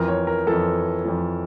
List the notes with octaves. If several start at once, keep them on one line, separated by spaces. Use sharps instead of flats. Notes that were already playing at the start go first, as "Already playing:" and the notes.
Already playing: F2 E3 A#4
C#5
A#4
F2 E3 A4
F2 E3